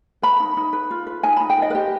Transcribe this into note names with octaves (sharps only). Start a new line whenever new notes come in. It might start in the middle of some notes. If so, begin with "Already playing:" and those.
B4 B5
D#4
D#4
B4
F4
B4
D#4 G#5
D#4 B5
G5
B4
D#5
B4
G4 C5